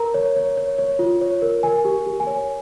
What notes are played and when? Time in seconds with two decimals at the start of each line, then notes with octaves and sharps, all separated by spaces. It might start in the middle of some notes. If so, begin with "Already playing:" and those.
Already playing: A#4 A#5
0.14 C#5
0.36 C#5
0.57 C#5
0.78 C#5
0.99 F4
1.21 C#5
1.42 A#4
1.63 A#4 G#5
1.85 G4
2.06 G4
2.20 G#5
2.27 C#5